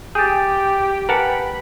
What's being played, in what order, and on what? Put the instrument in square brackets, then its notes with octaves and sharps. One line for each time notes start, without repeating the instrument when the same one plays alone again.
[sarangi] G4 [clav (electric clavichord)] G#4 [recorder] G5 [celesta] G6 A6
[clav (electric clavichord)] A#4 F#5 A5 [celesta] B4 G#5 C#7 [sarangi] B5